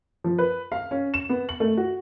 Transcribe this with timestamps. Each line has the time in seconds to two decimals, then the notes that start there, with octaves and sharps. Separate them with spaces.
0.24 F3
0.38 B4
0.72 F5
0.91 C#4
1.14 E7
1.29 B3
1.49 F#7
1.60 A3
1.77 F#4